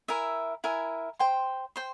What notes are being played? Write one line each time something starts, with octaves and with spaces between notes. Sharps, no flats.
E4 A#4 E5 G#5
E4 A#4 E5 G#5
C5 G5 C6
C5 G5 C6